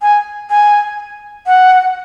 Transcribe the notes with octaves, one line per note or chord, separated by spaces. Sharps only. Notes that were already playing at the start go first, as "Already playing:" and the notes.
G#5
G#5
F#5